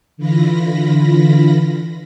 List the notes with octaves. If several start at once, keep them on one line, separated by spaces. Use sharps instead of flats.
D3 E3 F4 B5 A#6